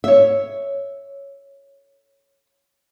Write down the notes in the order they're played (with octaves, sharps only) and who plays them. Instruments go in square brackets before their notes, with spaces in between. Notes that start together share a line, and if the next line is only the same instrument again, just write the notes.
[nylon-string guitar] C#5 E5